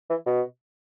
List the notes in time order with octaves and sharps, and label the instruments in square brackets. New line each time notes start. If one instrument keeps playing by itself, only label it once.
[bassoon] E3
B2